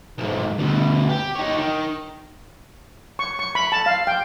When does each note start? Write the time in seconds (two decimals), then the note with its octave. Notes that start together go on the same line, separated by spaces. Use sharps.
0.18 B1 G#2
0.58 D2 B2
1.09 G4
1.36 D#4 C#5
1.57 D#3
3.19 C#6
3.39 C#6
3.55 B5
3.72 A5
3.86 F5
4.07 G5